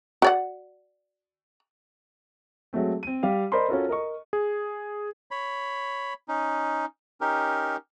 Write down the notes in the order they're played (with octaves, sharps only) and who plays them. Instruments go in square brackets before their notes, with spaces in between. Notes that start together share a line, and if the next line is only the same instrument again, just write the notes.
[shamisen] F#4 D5 F#5
[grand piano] F#3 G#3 A3 C4
C4 D#7
G3 G4 F5
A#4 C5 D5 D#5 B5 C6
C#4 F4 F#4 A4 A#4
A#4 D#5 C#6
[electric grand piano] G#4
[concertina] C#5 B5
C#4 D#4
C#4 D#4 G4 A#4